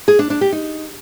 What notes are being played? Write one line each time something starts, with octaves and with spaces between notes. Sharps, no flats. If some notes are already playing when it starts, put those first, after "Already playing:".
G#4
D4
D4
G4
D#4